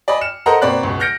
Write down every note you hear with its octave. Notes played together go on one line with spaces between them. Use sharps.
D5 D#5 G#5 B5
F6 C#7 E7
A4 A#4 C5 D#5 F#5 A#5
B2 A#3 C4 D5 B5 F#6
C#2 B2
F6 G6 A#6 C#7 D7